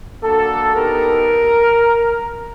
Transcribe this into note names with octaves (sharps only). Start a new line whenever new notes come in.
A#3 D4 F#4 A4
B3 D#4 G4 A#4